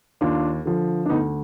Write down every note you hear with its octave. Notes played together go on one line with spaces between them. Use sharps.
D#2 D4 F4
D3 F3
D4
D2 B3 D#4